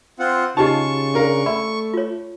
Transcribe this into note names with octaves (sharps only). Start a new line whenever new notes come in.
C4 F4 F#5
C#3 D#4 F4 G4 G#4 D#5 A5 C#6
D4 A#4 F5
A3 D5 E5 B5
F4 C#5